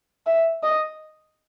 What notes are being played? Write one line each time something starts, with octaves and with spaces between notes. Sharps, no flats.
E5
D#5